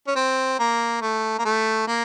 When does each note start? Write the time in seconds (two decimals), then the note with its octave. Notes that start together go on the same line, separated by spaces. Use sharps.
0.08 C#4
0.16 C4
0.59 A#3
1.01 A3
1.38 A#3
1.45 A3
1.87 A#3